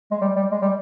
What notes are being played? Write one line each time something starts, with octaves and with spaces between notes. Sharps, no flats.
G#3
G3
G3
G#3
G3